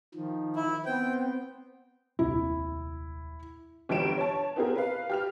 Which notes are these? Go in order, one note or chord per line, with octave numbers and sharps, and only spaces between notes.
D#3 F3
E4
B3 C4 G5
D#1 C2 E4
G1 E2 G3 G4 D7 E7
C#5 A5
B3 C4 E4 G4 G#4 A#4
B4 F5
G4 F6 F7